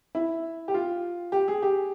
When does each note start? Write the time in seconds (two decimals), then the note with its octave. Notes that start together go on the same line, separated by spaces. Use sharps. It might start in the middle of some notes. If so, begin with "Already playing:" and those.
0.15 E4
0.68 G4
0.74 F4
1.32 G4
1.48 G#4
1.63 G4